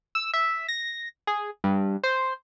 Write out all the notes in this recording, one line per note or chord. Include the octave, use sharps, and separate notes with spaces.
E6
E5
A#6
G#4
G2
C5